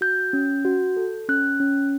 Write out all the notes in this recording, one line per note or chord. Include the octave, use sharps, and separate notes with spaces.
F#4 G6
C#4
F#4
A4
C#4 F#6
C#4